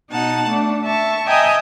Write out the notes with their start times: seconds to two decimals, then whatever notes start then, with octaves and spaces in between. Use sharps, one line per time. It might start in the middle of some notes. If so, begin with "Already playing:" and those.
0.12 B2 D#4 F#5 A5
0.47 A3 D4
0.83 E5 A5 C#6
1.26 D#5 E5 G5 G#5 A#5 D#6